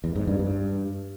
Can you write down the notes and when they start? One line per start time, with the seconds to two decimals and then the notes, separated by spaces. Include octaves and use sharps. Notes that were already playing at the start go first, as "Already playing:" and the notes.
0.04 E2
0.16 G#2
0.27 G2
0.39 G2